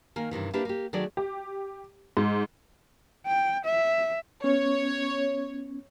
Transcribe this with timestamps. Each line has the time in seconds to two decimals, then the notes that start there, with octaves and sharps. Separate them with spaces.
0.16 D#3 A#3 G#5
0.31 G2 C3 D#3 E3
0.53 A#3 D4 E4 G4 B4
0.65 A#3 G4
0.93 D#3 F#3 A3 G#4 D5
1.17 G4
2.17 G#2
3.26 G5
3.65 E5
4.44 B3 C#4 C#5